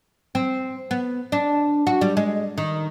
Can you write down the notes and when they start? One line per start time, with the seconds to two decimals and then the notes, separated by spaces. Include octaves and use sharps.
0.35 C4
0.91 B3
1.32 D4
1.87 F#4
2.01 G3
2.17 G#3
2.58 D#3